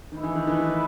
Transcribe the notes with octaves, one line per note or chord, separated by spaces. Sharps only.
D#3 A3 E4 B4 D#5
E3
D#3
E3
D#3